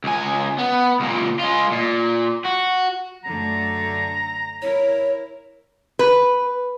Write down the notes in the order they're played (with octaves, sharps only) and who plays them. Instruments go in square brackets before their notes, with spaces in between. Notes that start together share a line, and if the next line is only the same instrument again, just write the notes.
[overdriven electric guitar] C#2 G#5
B3
C#2 A#2
G#3 F4
A#2
F#4
[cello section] F#2 D3 A3 [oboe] A#5
[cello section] E4 A#4 [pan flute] C#5
[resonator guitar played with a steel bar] B4